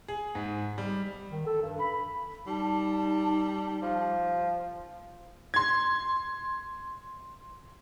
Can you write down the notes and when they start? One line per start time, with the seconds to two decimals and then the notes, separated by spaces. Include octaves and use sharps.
0.08 G#4
0.35 G#2
0.78 G3
1.31 D#3
1.47 A4
1.62 G2
1.79 B5
2.47 G3 D#4 A5
3.82 F3
5.54 C6 G#6